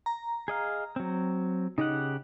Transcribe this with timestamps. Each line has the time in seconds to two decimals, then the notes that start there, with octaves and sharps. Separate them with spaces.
0.06 A#5
0.48 G#4 D#5 F5
0.96 F#3 C4
1.78 C#3 D#4 G4 F#5